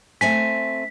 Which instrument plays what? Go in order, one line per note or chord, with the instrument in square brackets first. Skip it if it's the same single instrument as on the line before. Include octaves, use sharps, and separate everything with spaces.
[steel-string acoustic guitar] A3 C4 G#5 [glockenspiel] B6